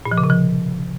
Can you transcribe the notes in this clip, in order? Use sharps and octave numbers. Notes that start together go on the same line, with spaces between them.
A#2
F3
C#3
C3
F3